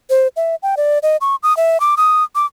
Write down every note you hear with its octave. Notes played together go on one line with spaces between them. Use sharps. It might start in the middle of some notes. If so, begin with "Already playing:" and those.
C5
E5
G5
D5
D#5
C#6
D#6
E5
D6
D#6
D6